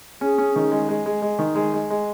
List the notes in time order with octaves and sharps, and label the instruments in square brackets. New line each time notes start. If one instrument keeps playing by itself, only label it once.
[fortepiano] C#4 [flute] G#4
[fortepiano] C#4
D#3
G#3
G#3
G#3
G#3
D#3
G#3
G#3
G#3